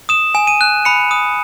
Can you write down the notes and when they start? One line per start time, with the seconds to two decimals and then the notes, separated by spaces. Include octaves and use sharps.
0.09 D#6 E7
0.35 G#5
0.47 D#7
0.61 F#6
0.85 B5 C#7
1.11 D#6